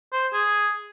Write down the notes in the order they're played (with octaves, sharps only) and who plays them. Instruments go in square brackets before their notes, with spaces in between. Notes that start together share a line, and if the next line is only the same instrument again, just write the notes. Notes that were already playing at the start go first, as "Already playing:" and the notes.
[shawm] C5
G#4